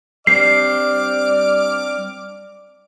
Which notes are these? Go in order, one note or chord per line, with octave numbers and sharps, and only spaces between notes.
G3 C4 D4 D5 D6 F6 C7